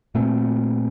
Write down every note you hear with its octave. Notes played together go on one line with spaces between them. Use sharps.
A#2 A3 C4